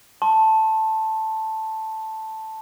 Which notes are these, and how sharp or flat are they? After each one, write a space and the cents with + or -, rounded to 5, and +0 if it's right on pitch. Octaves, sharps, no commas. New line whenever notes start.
A5 +0 C6 +30